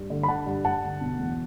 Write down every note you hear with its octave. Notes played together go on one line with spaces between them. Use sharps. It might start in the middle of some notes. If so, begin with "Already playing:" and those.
Already playing: G2
D3
B5
D3 F#5 A5
G2
G2 F#5 A5
D3
B2
E2